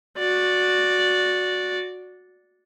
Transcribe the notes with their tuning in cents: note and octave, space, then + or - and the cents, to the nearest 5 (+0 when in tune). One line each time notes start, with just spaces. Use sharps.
F#4 -15 D5 +0